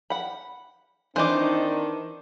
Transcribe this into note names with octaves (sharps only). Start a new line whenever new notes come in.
F#5 B5
D#3 E3 C4 D4 D#4 C5 D6